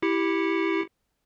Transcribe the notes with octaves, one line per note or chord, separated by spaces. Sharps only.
E4 G4 C#7